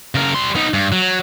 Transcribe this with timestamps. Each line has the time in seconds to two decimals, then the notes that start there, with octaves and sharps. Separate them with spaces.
0.15 C#3 A#4
0.35 G3 C6
0.55 B3 D#4
0.74 G2
0.92 F#3